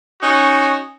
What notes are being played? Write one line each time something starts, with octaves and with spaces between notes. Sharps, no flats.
C#4 D#4 F#4